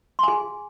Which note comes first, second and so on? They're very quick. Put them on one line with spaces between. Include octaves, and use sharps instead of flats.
C6 G#5 G#4